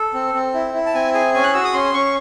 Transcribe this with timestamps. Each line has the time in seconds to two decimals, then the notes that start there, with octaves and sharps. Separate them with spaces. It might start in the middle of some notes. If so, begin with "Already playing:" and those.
Already playing: A4
0.14 C4
0.34 C4
0.54 E4
0.74 E4
0.86 A5
0.94 C4 G#5
1.14 G#4 G#5
1.34 C#4 G#5
1.44 F#6
1.54 F#4 E6
1.64 D#6
1.74 C#4 C6
1.94 C#4 C#6